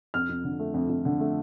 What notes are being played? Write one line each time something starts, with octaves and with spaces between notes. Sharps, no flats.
F2 F6
F2
D3
A3
F2
F2
D3
A3